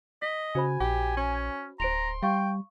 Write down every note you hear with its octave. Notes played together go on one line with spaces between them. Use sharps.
D#5 B6
C#3 F#4 C5 G#5 B5
A#1 G4
C#4
D1 C5 A#5 C6 D7 F7
G3 F5 G5 C#6